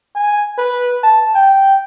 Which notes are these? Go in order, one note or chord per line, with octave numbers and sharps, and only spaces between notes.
G#5
B4
A5
G5